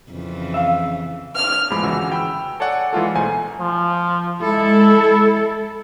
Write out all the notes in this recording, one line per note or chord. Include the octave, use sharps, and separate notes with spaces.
F2 C#3 E3
E5 F5
F6
E2 A2 F3 G#3 B5 D6
G1 C#3 E3 F#4 E6
G5 B5 E6
A4 C#5 D5 F#5 G#5
E3 G#3 F4 A4
B1 A3 C5 G#5 A#5
F3
G#3 E4 A4